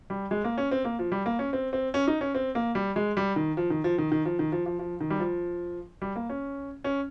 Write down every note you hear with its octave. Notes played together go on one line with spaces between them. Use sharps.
G3
G#3
A#3
C#4
C4
A#3
F3
G3
A#3
C#4
C4
C4
C#4
D#4
C#4
C4
A#3
G3
G#3
G3
D#3
F3
D#3
F3
D#3
D#3
F3
D#3
F3
F3
F3
D#3
G3
F3
G3
A#3
C#4
C#4